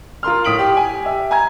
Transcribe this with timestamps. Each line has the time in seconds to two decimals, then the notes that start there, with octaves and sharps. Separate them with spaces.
0.23 F4 A#4 C6 F6
0.45 A2 D#6 B6 D7 F#7
0.59 G4
0.77 G#5
1.04 G4 E5
1.31 G#5 A#5 G#6